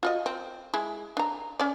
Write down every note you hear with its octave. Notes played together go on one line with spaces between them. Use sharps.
F4 F#4 D#5
C4
G#3 E4
D4 A#5
C#4 D5